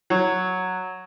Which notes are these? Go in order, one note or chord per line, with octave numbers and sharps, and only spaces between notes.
F#3